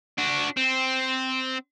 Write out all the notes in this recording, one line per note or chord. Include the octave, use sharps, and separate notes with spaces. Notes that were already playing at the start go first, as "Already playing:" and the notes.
D4 F#4
C4